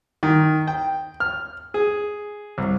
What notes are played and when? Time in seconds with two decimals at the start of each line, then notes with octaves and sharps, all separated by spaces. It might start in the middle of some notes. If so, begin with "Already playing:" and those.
0.23 D#3
0.68 G5
1.20 F6
1.74 G#4
2.58 C2